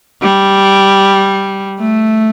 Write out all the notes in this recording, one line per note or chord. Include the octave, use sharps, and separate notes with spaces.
G3
A3